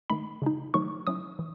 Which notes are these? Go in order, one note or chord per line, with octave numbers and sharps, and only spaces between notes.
D#3 A3 D#4 B5
C#3 G#3 D#4
D#3 F#3 A3 D#4 C#6
F#3 C#4 E4 D#6
E3